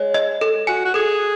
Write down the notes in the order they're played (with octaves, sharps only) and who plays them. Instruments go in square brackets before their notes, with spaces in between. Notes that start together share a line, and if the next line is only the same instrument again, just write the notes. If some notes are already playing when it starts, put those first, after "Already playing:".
Already playing: [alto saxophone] G#3 [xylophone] C#5
[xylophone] D#5
A4
[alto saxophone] F#4 [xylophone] G#5
[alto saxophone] F#4
[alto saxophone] G#4 [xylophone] A4